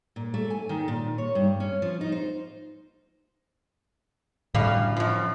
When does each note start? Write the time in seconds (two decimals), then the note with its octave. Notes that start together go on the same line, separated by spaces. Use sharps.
0.16 A#2
0.34 A3
0.50 G#5
0.69 D#3
0.88 A#2
1.18 C#5
1.35 G2
1.60 C#4
1.82 F3
2.01 D#4
2.12 C5
4.54 F#2 A2 D3 G3 F5
4.97 F#2 F3